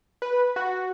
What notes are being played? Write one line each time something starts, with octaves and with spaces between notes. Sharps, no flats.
B4
F#4